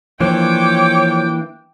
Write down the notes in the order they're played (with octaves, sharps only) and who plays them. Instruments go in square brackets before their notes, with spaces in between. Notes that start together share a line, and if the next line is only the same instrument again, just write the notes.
[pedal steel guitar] E3 A#3 D4 [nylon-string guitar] F3 [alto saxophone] C#5 [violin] G5 D6